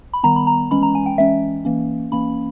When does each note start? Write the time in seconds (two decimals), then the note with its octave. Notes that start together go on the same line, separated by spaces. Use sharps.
0.13 B5
0.23 D#3 G3 B3 A#5
0.36 B5
0.47 A#5
0.71 E3 G#3 C#4 B5
0.83 A#5
0.95 G#5
1.06 G5
1.18 E3 G#3 C#4 E5
1.65 E3 A#3 C#4
2.12 E3 A#3 C#4 B5